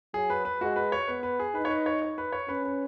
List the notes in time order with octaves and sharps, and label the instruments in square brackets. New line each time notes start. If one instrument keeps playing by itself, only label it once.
[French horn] F#3 [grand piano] G#4
[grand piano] B4
B4
[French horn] G#3 [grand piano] F#4
[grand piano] B4
C#5
[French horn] B3 [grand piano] B4
[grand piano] B4
G#4
[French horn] D#4 [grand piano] B4
[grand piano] C#5
B4
C#5
C#5
B4
C#5
[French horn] C#4 [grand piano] B4
[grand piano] B4